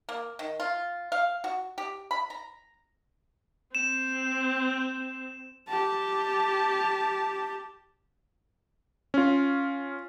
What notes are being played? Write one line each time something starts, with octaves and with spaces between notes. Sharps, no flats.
A#3
D#3
F4
F5
F#4
G4
B5
A#5
C4 E7
G4 A5
C#4 F4